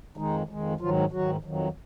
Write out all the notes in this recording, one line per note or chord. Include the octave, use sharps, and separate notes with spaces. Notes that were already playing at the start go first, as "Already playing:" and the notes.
F2 D#3 G#3 D#4
F2 D#3 G#3
G#2 D#3 F3 F#3 F4
G#2 D#3 F#3 F#4
F2 D#3 F#3